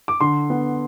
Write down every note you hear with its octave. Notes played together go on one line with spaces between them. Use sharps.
D6
D3 C6
B3